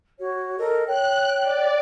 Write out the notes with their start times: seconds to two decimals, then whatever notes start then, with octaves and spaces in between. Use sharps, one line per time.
0.20 F#4 C#5
0.59 A4 A#4 D#5
0.87 C#5 G5 F#6
1.43 D5